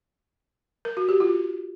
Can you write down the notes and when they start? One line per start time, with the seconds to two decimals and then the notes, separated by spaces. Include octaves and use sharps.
0.85 A#4
0.97 F#4
1.09 G4
1.20 F4